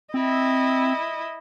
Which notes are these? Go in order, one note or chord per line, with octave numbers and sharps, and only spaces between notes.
C4 E4 D#5